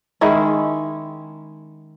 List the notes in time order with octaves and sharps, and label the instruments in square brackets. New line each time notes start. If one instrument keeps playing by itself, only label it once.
[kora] D#3 G#3 C#4 E4